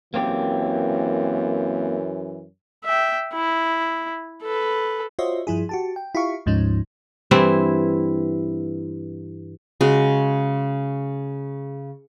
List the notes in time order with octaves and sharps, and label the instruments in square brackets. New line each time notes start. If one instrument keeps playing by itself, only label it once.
[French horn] F#2 [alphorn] E3 [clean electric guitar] A#3 C4 G4
[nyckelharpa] E5 G5
E4
A4 B4
[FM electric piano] F4 F#4 C5 C#5 D#5 E5
G2 F3 E4 G#4
F#4 G4 A5
G5
E4 F4 G4 F5 C#6
D2 G#2 F3 C#4 D#4
[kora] G2 E3 C4 E4
[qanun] C#3 G#3 F#4